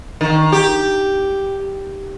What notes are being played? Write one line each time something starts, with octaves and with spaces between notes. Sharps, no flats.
D#3
G4